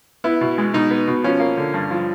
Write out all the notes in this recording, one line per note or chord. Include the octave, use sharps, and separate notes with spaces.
B3 E4
B2
G#3
B2 D#4
B3
B2
F3 C#4
A#3
D3
G2
F3